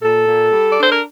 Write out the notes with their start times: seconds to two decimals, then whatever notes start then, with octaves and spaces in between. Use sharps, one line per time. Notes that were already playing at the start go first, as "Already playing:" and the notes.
0.03 A#2 A4
0.27 A#2
0.52 G3
0.71 D5
0.78 D4 C5
0.91 A#4